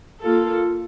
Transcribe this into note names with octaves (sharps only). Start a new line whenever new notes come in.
A#3 F4 A4